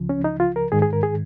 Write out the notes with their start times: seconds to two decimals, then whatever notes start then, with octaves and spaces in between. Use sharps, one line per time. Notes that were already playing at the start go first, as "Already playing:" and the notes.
Already playing: C#2 C#3 F3
0.09 C#4
0.24 D#4
0.40 F4
0.56 A#4
0.72 G#2 D#3 G#4
0.82 G#4
0.93 A#4
1.03 G#4